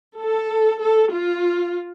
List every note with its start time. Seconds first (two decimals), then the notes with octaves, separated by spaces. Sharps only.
0.18 A4
0.82 A4
1.13 F4